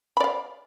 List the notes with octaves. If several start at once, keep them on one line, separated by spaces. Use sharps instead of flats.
D5 F5 B5